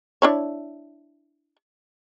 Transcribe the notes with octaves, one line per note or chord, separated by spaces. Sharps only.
D4 E4 C#5